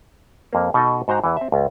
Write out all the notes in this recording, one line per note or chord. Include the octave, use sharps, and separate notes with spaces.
F2 A#3
B2 D#4 A4 D#5
G#2 F#4 C5 G5 A#5
E2 E3
C4 E5
C#2